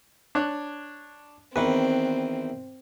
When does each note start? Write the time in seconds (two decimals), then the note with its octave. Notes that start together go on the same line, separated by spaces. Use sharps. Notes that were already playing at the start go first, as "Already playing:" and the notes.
0.35 D4 C#5 F#6
1.56 E2 D#3 C4 B4